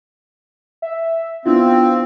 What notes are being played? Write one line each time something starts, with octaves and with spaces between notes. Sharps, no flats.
E5
B3 C4 D4 E4 F4